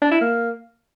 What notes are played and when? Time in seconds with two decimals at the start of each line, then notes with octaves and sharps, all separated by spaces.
0.02 D4
0.11 E4
0.21 A#3